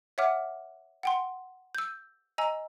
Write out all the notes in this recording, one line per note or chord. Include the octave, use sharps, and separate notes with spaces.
C#5 E5 F#5 D6 F6
F#5 G5 C6
E6 G6
D#5 G#5 A#5 E6